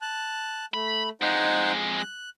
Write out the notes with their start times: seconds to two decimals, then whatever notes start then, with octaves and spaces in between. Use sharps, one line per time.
0.02 A5 F#6
0.74 A3 B5
1.21 F2 G#3 D#4 C5 F#5
1.99 F#6